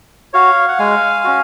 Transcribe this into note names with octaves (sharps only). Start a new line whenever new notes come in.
F#4 C#5 F5
F#5
G#3 F5 G#5
C#4 F#4